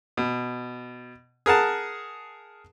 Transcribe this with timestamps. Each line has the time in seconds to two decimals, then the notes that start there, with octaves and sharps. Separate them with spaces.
0.17 B2
1.46 G#4 A#4 F#5 A5